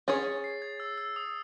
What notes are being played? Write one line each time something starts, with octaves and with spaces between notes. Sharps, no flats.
C#4 G#4 C#5 A6
C7
G#6
E6
E6
D#6